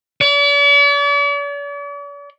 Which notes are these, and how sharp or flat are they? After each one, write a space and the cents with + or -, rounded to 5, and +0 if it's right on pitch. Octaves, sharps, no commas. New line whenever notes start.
D5 -45